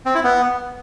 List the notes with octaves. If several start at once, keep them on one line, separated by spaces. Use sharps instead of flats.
C4
E4
B3